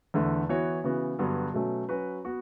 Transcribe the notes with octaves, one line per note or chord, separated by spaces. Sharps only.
E2 D3 A3
E3 B3 F#4 C#5
C#3 E3 B3 F#4
G2 D3 F#3 B3 F#4
B2 F#3 A3 C#4
F#3 C#4 F#4 B4
B3 F#4 B4